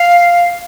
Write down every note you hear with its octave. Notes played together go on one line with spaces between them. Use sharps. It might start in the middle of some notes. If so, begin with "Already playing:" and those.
Already playing: F5